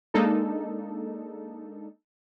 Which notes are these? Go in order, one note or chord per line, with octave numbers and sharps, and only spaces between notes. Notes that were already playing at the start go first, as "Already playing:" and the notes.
G#3 A#3 D4 D#4 A4